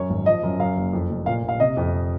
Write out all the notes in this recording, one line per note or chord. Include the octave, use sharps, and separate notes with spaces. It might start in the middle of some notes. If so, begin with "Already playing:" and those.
Already playing: F#2 C#5
G#1
F3 D#5
F#2
F#2 F5
F#1
F2
F1
A#2 F5
A#1
F5
C3 D#5
F2